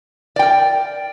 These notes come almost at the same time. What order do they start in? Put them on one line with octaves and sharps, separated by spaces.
D5 G5 A#4